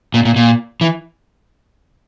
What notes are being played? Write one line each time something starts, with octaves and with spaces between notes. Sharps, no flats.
A#2
A#2
A#2
E3